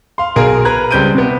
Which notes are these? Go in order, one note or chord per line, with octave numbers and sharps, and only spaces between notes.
F5 C6
B1 G#4 A#4 D7
B4 A#5 F#6 G#6
C#2 G3 C4 G6 D7 D#7
C3 B3